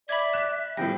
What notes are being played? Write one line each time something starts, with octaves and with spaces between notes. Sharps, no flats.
D5 E5 B5 G#6
F#6 E7
A2 F3 G3 G5 A#6